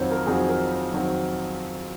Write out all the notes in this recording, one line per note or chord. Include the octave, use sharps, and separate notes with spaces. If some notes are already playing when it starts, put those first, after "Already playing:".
Already playing: F2 D#3 F#3 C4 C5 C#5
A#4
F2 D#3 F#3 C4 G#4
A#4
C5
F2 D#3 F#3 C4